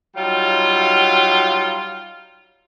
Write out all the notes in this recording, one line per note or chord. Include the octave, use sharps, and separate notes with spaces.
F#3 G3 D#4 F4